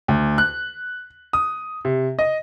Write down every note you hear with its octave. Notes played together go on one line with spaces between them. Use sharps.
D2
F#6
D#6
C3
D#5